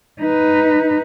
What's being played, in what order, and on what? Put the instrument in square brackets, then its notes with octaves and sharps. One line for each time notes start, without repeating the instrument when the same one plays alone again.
[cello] D#4 B4